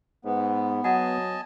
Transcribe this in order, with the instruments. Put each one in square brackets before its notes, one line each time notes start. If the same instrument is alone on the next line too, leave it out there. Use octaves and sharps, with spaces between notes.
[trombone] G#2 [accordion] B3
[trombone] F#3 [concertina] D#5 G#5 A5 [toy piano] F#5